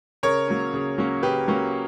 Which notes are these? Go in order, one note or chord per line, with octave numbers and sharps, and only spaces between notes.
C#3 A#4 C#5
F#3 A#3 C#4
C#3
F#3 A#3 C#4
C#3 G4 B4
F#3 A#3 C#4